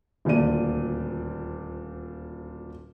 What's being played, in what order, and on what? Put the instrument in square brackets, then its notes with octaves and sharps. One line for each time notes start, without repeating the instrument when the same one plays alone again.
[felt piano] D#1 D2 A#2 D5 D#7